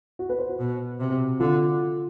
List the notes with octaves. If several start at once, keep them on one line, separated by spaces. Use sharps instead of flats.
F#4
B4
C5
F#4
B2
C3
D3 F4